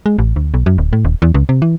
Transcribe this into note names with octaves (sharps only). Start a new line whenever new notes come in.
G#3
A1
D2
B1
F#2
D1
A2
D#1
E2
C#2
C3
E3